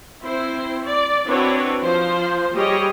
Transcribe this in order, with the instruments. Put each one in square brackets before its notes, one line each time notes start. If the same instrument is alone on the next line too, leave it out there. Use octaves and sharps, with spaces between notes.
[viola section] C4 E4 C5
D5
C4 D4 E4 F#4 B4 C#5
F3 C5
G3 G4 G#4 C#5 D#5